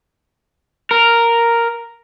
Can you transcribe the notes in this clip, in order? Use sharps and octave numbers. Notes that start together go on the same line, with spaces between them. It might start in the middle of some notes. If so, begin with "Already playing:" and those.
A#4